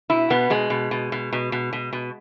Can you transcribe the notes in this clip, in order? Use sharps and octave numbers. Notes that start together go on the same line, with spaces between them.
B2 E4
B2 B3
B2 G#3
B2
B2
B2
B2
B2
B2
B2